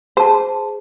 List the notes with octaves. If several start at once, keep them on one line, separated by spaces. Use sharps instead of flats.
G#4 C5 A5